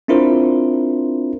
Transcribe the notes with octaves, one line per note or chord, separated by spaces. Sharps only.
C4 D4 E4 F4 A#4 C5